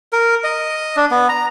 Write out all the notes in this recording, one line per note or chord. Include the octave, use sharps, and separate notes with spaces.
A#4
D#5
D4
B3
A#5